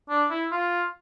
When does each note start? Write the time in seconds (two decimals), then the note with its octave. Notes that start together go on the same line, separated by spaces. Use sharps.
0.09 D4
0.30 E4
0.52 F4